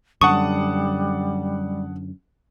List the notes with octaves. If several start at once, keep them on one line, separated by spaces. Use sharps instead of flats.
F#2 D3 G3 F#5 A5 C#6 D#6